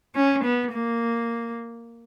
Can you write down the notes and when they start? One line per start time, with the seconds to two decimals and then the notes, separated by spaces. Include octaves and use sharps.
0.15 C#4
0.44 B3
0.72 A#3